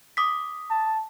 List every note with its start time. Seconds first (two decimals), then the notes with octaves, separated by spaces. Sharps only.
0.17 D6 D#6 B6
0.70 A5